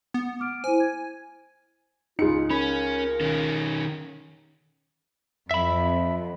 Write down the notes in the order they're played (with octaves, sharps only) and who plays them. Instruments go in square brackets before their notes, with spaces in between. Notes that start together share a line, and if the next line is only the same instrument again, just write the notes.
[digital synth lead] B3
[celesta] D6 F6 D7
[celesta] E4 C5 [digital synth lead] G#5
[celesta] G#6
[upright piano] C#2 G#4 C#7 [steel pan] D#4 [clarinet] F4
[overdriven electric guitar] C#4 [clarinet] A#4 [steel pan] B5
[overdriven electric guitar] D#3 C#4
[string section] F2 [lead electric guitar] E5 B5